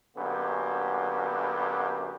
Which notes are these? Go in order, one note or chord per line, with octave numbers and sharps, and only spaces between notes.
F#2 D3 A#3 B3 G4